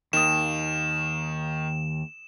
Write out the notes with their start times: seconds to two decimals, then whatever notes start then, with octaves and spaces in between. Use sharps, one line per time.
0.13 D#2 D#3 D#6 E7